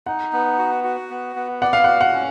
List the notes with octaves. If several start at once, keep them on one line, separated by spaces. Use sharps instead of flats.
D#4 F#5
B3
F#4
F#4
B3
B3
D5 F#5
F5
F#4 F#5
F#5
C#4